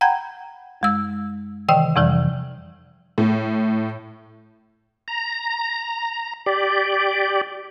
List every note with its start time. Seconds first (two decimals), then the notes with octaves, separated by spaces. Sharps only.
0.01 F#5 G5 A#5 B5 G6 G#6
0.81 F#2 G#3 E6
1.68 C3 D#3 E3 D#5 G5
1.96 F2 C3 E3 F3 G3
3.18 A2
5.08 A#5
6.46 G4 D5